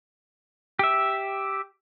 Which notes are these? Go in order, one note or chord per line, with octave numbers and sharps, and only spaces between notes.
G4 E5